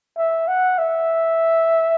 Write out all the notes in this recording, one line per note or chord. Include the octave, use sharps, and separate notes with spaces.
E5
F#5
E5